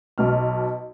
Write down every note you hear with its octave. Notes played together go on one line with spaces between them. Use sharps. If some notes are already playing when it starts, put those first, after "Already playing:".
B1 B2 F6